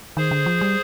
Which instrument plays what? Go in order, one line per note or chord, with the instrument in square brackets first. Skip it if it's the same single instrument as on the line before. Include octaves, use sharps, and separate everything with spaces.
[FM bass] D#3 [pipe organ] G#4 C5
[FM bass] D3
F3
G3